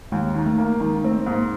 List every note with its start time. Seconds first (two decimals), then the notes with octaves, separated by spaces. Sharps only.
0.12 D#2 G#3
0.35 D#3
0.46 A3
0.58 A#3
0.80 D#3 G#3
1.04 A3 C4
1.18 A3
1.26 G#2 A#3